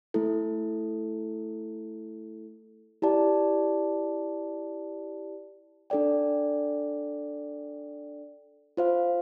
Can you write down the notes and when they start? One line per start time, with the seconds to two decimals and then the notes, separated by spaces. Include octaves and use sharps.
0.14 A3 E4 A4
3.02 E4 G4 D5 A5
5.90 D4 A4 D5 G5
8.77 F4 C5 F5